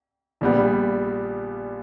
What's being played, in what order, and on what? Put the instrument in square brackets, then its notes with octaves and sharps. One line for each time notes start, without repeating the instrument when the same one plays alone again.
[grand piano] A#1 A#2 G3 B3